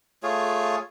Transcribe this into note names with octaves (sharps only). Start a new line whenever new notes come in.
A3 F4 G#4 C#5